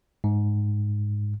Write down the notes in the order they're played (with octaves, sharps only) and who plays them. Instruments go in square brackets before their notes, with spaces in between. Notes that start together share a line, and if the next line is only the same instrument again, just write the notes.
[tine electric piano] G#2